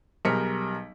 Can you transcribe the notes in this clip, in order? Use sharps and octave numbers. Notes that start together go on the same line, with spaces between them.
B1 G3 G#4 A#4 B6 C#7